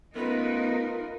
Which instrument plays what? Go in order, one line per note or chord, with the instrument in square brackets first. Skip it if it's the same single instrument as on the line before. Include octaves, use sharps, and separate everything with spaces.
[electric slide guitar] A3 B3 C#4 [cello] D#4 A#4 [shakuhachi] F4 [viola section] B4